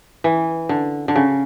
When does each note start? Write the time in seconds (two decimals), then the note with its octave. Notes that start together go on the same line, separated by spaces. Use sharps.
0.24 E3
0.69 D3
1.08 D3
1.16 C#3